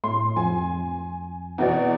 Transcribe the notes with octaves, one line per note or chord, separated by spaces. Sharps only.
A2 C6
F2 G#5
E2 B2 D5